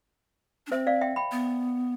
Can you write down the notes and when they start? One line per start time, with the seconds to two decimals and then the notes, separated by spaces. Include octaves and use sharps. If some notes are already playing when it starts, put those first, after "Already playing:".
0.67 D4
0.71 C4 C5 E5
0.87 D5 F5
1.01 E5 G5
1.16 G5 B5
1.32 B3